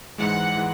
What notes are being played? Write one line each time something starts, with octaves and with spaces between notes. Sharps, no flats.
G#2 E3 G#3 F#5
E3 G#3